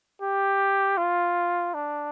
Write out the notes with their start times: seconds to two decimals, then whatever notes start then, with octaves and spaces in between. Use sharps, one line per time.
0.22 G4
0.98 F4
1.74 D4